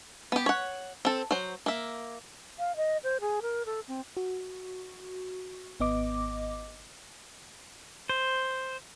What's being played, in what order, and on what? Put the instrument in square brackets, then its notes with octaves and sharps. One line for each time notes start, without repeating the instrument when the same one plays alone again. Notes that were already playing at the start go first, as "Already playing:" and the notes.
[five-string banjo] B3 G4
C#5 F#5
C4 A4
F#3 C5
A#3 E5
[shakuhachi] F5
D#5
C5
G#4
A#4
A4
C4
[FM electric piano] F#4
G#1 B3 D#5 D6
[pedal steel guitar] C5